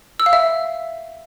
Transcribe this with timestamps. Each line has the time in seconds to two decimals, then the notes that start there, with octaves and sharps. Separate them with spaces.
0.20 E6
0.26 F5
0.33 E5